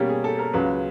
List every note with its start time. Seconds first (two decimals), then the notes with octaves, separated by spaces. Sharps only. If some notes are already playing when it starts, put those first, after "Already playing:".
Already playing: B2 G3 A#3 C#4 G4
0.09 G#4
0.24 A4
0.39 A#4
0.53 C#2 C#3 F#3 B4